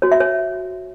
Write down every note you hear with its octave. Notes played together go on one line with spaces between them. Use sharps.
F#4 C#5
E5
C#5